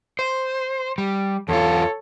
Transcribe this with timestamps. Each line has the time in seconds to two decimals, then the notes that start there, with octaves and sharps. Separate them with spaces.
0.19 C5
0.98 G3
1.49 E2 F4 A4 C#5